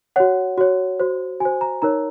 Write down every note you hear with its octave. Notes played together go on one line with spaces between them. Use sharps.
F#4 C#5 F#5
F#4 C#5
F#4 C5
F#4 C5 G#5
A#5
D#4 A#4 C#5 A#5